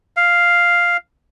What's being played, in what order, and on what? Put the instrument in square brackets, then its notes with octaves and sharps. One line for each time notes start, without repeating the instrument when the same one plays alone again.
[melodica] F5